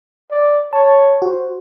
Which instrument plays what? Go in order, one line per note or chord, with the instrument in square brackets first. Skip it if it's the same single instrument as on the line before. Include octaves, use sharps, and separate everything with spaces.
[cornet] D5
[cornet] C#5 [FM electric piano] A5
[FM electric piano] F#4 [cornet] C5